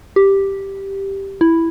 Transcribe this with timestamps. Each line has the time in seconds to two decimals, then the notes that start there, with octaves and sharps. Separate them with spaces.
0.16 G4
1.41 E4